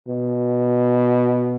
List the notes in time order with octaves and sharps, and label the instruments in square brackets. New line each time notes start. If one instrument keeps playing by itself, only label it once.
[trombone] B2